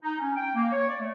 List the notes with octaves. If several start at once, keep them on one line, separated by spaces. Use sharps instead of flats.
D#4
C#4
G5
A#3
C#5
D5
A3